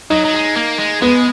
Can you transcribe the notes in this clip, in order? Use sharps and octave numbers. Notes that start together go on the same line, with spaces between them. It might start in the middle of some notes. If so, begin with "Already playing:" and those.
F#3 D#4
F#3
G#3
A#3
G#3
G#3 B3